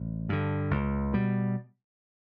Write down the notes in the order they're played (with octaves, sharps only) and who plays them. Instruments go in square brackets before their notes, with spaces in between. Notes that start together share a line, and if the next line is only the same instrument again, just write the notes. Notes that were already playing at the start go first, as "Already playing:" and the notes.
Already playing: [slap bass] A1
G2 D3
C#2
B2 G3